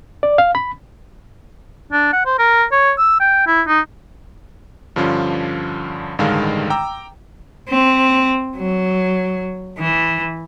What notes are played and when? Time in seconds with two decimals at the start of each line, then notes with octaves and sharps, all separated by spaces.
0.23 D5
0.38 F5
0.55 B5
1.92 D4
2.13 F#5
2.26 C5
2.39 A#4
2.72 C#5
2.99 E6
3.20 G5
3.47 E4
3.67 D#4
4.96 G2 D3 F3 C#4 D4 F4
6.18 A1 G2 D3 D#3 G#3 F5
6.70 G5 A#5 D6 E6
7.69 C4
8.56 F#3
9.79 E3